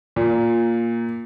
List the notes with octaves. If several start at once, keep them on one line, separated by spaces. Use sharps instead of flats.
A#2